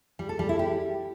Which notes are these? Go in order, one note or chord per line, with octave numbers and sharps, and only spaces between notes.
G3
A4
G3
E4
G4